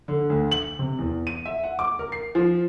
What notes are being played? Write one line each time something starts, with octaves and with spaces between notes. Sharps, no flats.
D3
D2
F#7
C3
E2
D#7
E5
F#5
D6
A#4
C7
F3